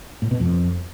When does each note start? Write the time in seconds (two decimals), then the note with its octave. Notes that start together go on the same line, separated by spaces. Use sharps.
0.22 A2
0.31 B2
0.40 F2